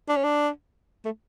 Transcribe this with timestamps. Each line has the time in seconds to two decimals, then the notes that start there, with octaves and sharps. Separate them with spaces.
0.09 D4
0.16 C#4
0.24 D4
1.05 A3